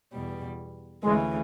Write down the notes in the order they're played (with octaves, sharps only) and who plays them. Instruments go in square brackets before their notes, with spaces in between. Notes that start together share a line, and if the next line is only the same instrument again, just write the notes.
[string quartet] E2 B2 G3
[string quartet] D2 C#3 E3 [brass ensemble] G#3